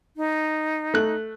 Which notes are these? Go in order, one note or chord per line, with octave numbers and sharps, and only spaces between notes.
D#4
A3 F#6